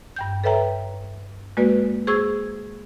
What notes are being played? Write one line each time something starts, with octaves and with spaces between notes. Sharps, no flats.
G2 G5 G6
A4 B4 C#5 E5 G5 A#5
G#3 A#3 F#4 B4 D5
G#4 C5 C#6 E6 G#6